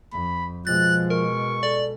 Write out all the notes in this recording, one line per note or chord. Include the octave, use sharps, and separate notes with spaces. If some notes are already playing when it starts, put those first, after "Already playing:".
F2 B5
B2 F3 G#3 F#6 A6
A#4 C#6
A4 D5